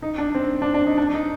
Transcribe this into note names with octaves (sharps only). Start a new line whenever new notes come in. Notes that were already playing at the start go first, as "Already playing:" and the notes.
D#4
D4
C4
D4
D4
D#4
D4
D#4